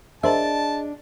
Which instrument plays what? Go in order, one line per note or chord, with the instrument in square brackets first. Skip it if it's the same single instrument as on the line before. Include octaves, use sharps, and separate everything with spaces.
[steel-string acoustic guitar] D4 [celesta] G#4 D#5 [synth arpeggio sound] A#4 C5 E5 [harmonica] A5